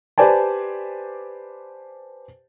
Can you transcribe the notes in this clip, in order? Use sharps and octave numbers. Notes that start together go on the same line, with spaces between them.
G4 B4 C5 D5 G#5 A5